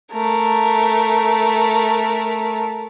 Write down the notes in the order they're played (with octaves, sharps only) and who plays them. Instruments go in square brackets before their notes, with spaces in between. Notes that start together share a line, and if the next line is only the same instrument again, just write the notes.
[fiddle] A3 A#4